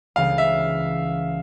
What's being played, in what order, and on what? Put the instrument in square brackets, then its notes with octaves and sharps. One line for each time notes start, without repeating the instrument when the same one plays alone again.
[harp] C#2 C#3 E3 G3 A#3 [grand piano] F5
[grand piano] E5